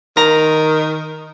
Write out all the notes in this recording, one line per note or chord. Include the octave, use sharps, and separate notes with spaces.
D#3 A#5